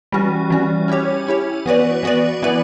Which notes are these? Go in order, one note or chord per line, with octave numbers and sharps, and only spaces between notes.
E3 G3 C#4 F#4
E3 G3 C#4 F#4
C#4 E4 G4 C#5
C#4 E4 G4 C#5
E3 B3 F#4 B4 D5
E3 B3 F#4 B4 D5
E3 B3 E4 B4 D5